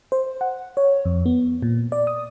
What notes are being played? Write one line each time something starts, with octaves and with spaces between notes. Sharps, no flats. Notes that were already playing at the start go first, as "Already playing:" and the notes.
C5
F#5
C#5
F2
B3
A#2
D5
D#6